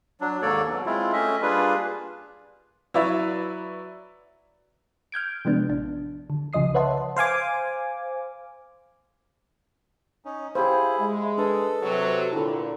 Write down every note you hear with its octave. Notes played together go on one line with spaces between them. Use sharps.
F#3 D4
D#2 G#2 A#3 A4 C#5 D5
B2 F#3
G#3 C4 E4 F4
A3 C#4 D#5 E5
G3 A#3 D4 F4 G#4 B4
F#3 E4 B4 C#5 D5 E5
F6 G6 G#6 D7
C3 F3 G#3 B3 D4
A1 D4
D3
C2 C#3 F3 D#5 D#6 C7
B4 C#5 E5 F#5 A5 C6
C5 F5 G#5 D6
C#4 D#4
E4 G4 G#4 C5 F5
G#3 E5
D4 A4 B4
C3 F#3
A#2 D3 E4 F4 A4